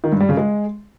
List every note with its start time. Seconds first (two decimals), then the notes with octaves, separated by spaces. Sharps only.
0.04 D#3
0.12 G2
0.20 G3
0.29 C#3
0.37 G#3